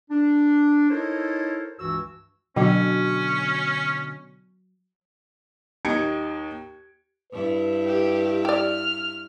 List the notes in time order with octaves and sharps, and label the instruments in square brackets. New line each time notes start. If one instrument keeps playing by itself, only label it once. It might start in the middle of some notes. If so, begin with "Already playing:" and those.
[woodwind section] D4
D#4 E4 A4 A#4 C5 C#5
C#2 G2 E3 F#4 E6
[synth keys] B2 D3 [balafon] F#3 F#4 G5 [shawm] C#4
[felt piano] D#2 D#4 G#6 C#7 D7
[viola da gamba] G2 E4 [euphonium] B4
[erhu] G4
[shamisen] G4 D5 [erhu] F6